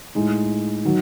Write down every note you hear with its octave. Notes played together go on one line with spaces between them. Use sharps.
A2 G#3 D#4
D#3 F#3